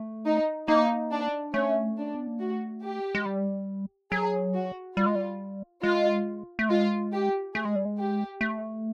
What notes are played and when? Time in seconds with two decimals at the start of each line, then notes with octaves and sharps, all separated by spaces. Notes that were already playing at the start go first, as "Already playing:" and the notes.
Already playing: A3
0.25 D#4
0.68 A#3 D#4
1.11 D4
1.54 A3 C#4
1.97 D4
2.15 B3
2.27 A#3
2.40 A3 F#4
2.83 G4
3.15 G#3
3.26 G3
4.12 F#3 G#4
4.54 F#4
4.97 G3 F4
5.06 G#3
5.15 G3
5.83 G#3 F4
6.59 A3
6.69 G#3 F4
7.12 G4
7.54 A3 G#4
7.65 G#3
7.75 G3
7.85 G#3
7.98 G4
8.41 A3